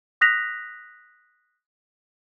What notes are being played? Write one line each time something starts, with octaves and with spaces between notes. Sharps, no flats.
D#6 F#6 A#6 B6 F7